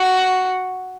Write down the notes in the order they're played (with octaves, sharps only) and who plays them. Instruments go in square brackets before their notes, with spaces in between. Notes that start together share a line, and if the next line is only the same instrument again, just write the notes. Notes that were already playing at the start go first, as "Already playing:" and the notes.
Already playing: [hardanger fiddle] F#4